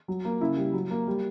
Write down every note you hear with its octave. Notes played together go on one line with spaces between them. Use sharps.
F#3
A#3
C#3 E4
G3
F#3
A#3
G3